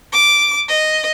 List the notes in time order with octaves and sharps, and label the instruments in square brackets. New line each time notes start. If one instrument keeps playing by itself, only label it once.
[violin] D6
D#5